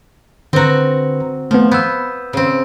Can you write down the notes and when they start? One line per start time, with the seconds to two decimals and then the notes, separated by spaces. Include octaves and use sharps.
0.53 D3 C4 F#4 B4 A#5
1.51 F3 A3 B3
1.71 B3 E6 G6
2.33 C#3 C4